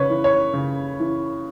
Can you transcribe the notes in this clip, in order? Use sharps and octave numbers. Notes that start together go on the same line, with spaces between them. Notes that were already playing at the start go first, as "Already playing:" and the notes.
Already playing: C#3 B4 C#5
E3
C#5
C#3
E3